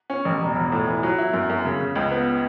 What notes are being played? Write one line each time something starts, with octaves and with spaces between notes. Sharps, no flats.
C#4
A1
E1
E1
A2
E3
F#3
E4
F#2
F#2
C#3
C#3
C#2
B3